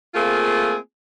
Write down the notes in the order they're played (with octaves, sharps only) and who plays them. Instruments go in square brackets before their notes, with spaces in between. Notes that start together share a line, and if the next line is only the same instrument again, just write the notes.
[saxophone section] A3 A#3 C4 F4 G#4